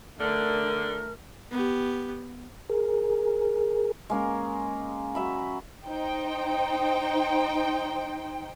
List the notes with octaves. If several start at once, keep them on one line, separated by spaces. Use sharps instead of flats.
D3 A3 A#4 F6
B3 G4
G#4 A#4
G#3 A#3 C#4 A#4
F#3 E5 B5
D#4 C5 G5